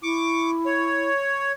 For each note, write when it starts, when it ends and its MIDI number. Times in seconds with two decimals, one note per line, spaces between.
0.03 1.10 64
0.03 0.51 85
0.03 0.51 86
0.66 1.52 73